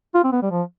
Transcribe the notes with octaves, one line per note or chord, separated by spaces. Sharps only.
F4
C4
B3
G3
F3